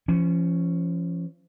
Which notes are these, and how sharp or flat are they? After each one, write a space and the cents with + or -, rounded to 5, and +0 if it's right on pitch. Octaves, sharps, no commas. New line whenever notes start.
F3 -35 C#4 +0